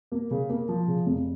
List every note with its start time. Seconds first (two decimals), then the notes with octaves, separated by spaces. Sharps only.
0.12 A#3
0.31 C#3
0.49 A#3
0.69 F3
0.88 C#3
1.06 F1